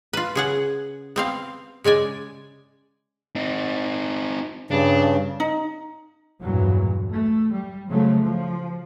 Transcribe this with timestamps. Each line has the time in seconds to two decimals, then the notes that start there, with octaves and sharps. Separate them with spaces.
0.13 F4 B4
0.35 C#3 G#4 F#5
1.16 B3 C4 F5
1.84 C#3 G#3 D5 G#5
3.35 C4 D#4
4.71 G2 C#3 D4
5.40 D#4
6.42 E2 G2 A#2 E3 F#3
7.11 A3
7.52 G3
7.90 C#3 F3 F#3 A3
8.22 F3